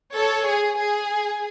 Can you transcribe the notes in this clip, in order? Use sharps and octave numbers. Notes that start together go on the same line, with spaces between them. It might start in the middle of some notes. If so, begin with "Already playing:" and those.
A4 C#5
G#4
G#4